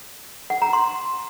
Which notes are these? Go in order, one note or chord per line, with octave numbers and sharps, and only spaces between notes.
F#5
A#5
C6